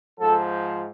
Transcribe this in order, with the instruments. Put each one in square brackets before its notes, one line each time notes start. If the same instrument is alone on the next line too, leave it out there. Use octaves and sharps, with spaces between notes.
[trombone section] G#2 F3 A4